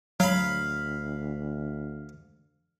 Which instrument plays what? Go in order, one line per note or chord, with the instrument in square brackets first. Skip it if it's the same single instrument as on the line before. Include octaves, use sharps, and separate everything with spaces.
[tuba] D2 [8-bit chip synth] F#3 [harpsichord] F5 B5